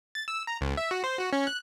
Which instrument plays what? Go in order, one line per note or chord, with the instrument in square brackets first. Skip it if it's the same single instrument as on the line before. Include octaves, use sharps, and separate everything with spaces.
[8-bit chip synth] A6
E6
A#5
C#2
E5
F#4
C5
F#4
C#4
F#6